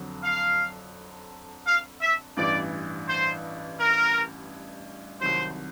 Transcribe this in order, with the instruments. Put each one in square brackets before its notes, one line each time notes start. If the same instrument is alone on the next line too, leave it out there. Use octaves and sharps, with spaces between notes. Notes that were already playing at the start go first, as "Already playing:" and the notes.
Already playing: [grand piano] F2 D3 F#3
[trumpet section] F5
F5
E5
[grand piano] A1 G2 E3 [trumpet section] D5
[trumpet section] C5
A#4
[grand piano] C2 C3 D#3 F#3 [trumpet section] C5